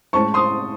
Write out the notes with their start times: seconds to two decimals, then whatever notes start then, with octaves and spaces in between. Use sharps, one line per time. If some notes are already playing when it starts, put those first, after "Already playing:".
0.13 A2 G#3 C#4 A5 C#6
0.34 C6 D#6